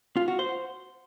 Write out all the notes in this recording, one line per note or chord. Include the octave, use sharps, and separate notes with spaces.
F4
F#4
C5